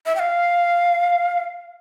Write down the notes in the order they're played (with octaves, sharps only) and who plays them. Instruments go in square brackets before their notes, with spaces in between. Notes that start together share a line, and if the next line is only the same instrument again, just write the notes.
[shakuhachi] E5
G5
F5